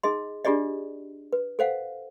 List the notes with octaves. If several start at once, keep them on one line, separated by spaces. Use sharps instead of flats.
D#4 G#4 D#5 C6
D4 F4 G4 G#4 D5 D#5
B4
A4 C5 F5 F#5